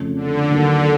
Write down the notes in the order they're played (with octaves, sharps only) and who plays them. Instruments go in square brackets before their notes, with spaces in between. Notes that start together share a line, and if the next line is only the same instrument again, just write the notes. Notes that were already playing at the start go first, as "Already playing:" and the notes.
Already playing: [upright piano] F2 C#3 F3 A3 C#4
[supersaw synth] D3
[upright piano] D#2 D#3 F#3 A#3 D4 [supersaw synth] D3